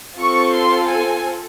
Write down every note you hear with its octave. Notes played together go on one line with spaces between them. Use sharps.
C4 F4 A4 C#6
C6
G#5